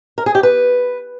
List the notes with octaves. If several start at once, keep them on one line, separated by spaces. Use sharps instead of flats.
A#4
G#4
G4
B4